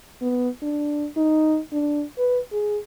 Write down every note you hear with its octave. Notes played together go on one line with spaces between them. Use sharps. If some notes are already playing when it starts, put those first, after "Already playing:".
B3
D4
D#4
D4
B4
G#4